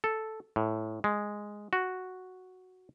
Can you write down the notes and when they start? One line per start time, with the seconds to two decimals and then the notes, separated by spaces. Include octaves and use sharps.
0.04 A4
0.56 A2
1.04 G#3
1.73 F#4